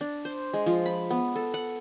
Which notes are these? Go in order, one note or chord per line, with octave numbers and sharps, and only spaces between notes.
D4
C5
G#3
F3
B5
B3
A4
F#5